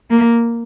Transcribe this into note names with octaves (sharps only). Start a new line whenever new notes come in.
A#3